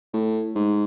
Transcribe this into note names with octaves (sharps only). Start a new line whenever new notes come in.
A2
G#2